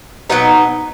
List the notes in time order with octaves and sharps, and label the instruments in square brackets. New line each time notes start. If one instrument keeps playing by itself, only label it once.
[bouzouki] B2 F#3 B3 D#4